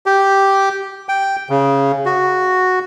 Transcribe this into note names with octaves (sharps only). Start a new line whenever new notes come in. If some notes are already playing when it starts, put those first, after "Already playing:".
G4
G5
C#3
F#4